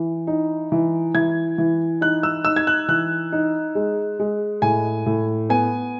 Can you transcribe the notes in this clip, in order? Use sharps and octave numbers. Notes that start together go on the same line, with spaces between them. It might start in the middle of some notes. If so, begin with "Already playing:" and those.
Already playing: E3
D#4
E3
E3 G#6
E3
D#4 F#6
E6
D#4 E6
G#6
F#6
E3 F#6
D#4
G#3
G#3
A2 G#5
A2
B3 G#5